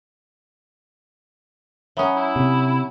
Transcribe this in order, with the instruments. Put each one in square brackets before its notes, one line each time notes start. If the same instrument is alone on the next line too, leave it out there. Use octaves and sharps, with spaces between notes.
[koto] F#3 C#4 [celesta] E5 B5 D#6
[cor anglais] E4
[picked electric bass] C3